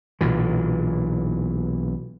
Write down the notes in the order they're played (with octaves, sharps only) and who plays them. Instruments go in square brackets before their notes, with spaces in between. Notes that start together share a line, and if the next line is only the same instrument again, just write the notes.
[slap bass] B1 A#2 E3